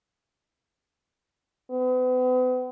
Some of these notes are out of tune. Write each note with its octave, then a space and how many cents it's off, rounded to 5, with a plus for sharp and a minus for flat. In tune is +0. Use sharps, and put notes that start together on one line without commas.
B3 +40